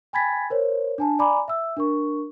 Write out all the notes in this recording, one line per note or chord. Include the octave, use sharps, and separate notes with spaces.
G5 G#5 B5 G#6 A6 B6
A#4 C5 C#5
D4 G#5 A5
D5 G#5 A#5 B5 D6
E5 E6
D4 A#4 C#6